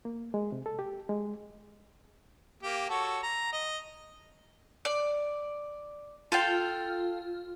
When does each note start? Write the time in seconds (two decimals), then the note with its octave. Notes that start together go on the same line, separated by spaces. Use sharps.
0.05 A#3
0.34 G#3
0.52 C3
0.66 A4
0.79 G4
1.09 G#3
2.63 A#3 G4
2.89 F#4 A4 C#5
3.23 A#5
3.53 D#5
4.85 D5
6.32 F4 A4 F5 G5